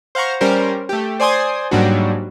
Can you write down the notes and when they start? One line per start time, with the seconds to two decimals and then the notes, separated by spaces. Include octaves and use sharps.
0.15 C5 F5 F#5 A#5 C#6
0.41 G3 C#4 G4 A#4 C5
0.89 A3 G4
1.20 C5 D5 G#5 C6 D#6 G#6
1.71 G#2 F#3 G3 A#3 D4 F#4